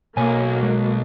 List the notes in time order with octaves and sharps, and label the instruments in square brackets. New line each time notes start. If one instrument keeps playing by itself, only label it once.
[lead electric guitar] B1 [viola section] F#3 A#3 [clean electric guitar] C#5 G#5
[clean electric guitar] G#3